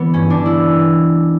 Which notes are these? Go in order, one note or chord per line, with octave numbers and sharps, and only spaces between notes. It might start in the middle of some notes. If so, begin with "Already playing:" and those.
Already playing: E3 A3 B3
G2 C#4
D4
E3
E4